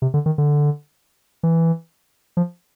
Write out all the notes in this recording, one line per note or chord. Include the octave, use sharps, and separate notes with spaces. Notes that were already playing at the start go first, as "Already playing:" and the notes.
C3
D3
D#3
D3
E3
F3